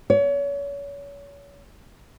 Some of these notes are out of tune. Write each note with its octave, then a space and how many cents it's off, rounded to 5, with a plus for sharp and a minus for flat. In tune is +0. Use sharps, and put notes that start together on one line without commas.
C#5 +35